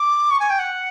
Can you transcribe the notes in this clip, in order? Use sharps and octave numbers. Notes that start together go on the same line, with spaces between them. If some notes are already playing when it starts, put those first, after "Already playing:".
Already playing: D6
C#6
G#5
G5
F#5